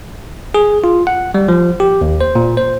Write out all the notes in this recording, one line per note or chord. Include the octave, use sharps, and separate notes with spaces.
G#4
F4
F#5
G3
F3
G4
D#2
C5
A#2
C5